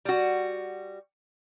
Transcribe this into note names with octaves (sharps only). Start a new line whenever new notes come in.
G3 F#4